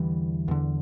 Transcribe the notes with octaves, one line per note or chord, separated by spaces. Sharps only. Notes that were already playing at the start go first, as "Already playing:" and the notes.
Already playing: E2 D3 E3 G3
E2 D3